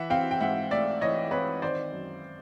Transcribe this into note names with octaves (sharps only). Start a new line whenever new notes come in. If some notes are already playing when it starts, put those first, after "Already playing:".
Already playing: E3 E5 F#5
C4 F5 G5
G5
G#2 E5 F#5
A3 D5 E5
E3 C#5 D#5
C4 B4 C#5
D#3 C5 D5
F#2